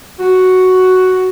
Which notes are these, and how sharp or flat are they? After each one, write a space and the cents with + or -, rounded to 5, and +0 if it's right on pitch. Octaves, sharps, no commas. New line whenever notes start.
F#4 +5